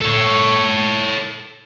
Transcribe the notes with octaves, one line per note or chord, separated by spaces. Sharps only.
A4 C#5